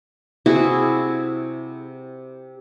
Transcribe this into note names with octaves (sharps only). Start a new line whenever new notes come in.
C3 E4 F#4 G#4